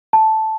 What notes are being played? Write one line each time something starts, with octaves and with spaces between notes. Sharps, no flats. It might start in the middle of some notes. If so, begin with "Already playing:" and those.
A5